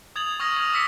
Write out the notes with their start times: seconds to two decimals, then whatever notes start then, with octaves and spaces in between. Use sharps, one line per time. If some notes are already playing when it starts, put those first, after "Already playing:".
0.16 D#6 G#6 A6 F7 F#7
0.40 C#6 D#6 F6 G#6 A#6
0.56 D#6 F6
0.72 D6 E6 B6 C#7